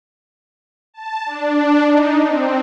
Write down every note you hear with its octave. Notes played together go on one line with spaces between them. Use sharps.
A5
D4
D#4
C4